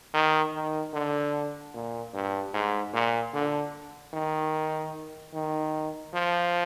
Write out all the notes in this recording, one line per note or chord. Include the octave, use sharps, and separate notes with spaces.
D#3
D#3
D3
A#2
G2
G#2
A#2
D3
D#3
D#3
F3